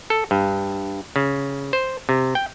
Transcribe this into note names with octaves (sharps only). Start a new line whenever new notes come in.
A4
G2
C#3
C5
C3
G5